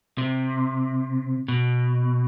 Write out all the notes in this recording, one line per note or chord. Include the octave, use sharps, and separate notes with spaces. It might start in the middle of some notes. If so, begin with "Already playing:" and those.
C3
B2